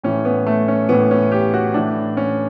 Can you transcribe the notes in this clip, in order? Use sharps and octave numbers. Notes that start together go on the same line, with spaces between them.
A2 E3 C#4
B3
A3
C#4
A2 E3 B3
C#4
G4
F#4
A2 E3 D4
C#4